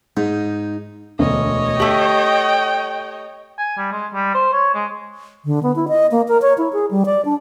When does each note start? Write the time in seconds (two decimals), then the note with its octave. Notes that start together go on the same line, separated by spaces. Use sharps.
0.17 G#2 D#4
1.19 E1 D2 C#5 D#5
1.80 A3 G4 G5 F#7
3.58 G#5
3.78 G3
3.92 G#3
4.14 G3
4.34 C5
4.53 C#5
4.74 G#3
5.45 D3
5.63 B3
5.76 E4
5.88 D#5
6.11 A#3
6.28 A#4
6.42 C#5
6.58 E4
6.73 G#4
6.91 G3
7.06 D5
7.25 D4